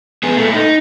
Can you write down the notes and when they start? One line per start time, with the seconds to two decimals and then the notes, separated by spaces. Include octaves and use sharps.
0.23 B3 G#4
0.37 A#2 A3
0.54 D#4